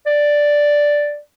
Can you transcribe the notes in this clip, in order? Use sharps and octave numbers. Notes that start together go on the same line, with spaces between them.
D5